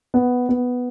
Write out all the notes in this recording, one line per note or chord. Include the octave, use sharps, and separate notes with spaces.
B3
B3